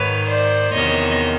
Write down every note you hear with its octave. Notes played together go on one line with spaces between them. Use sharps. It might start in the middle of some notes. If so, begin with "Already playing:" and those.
Already playing: G#2 D#3 B4 C#5
C5 D5
E2 C3 D#3 C#5 D#5